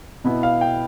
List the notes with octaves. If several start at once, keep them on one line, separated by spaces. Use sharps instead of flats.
B2 B3 E4
F5
G5